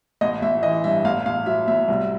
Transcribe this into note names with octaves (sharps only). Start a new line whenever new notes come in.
A1 D#5
A1 E5
E3 D#5
G2 E5
A1 F5
A1 F5
F#3 E5
A2 E5
C2